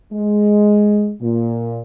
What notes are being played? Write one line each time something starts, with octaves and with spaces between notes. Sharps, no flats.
G#3
A#2